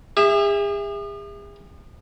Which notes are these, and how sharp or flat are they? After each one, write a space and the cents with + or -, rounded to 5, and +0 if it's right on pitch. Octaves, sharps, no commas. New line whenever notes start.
G#4 -40 E5 +0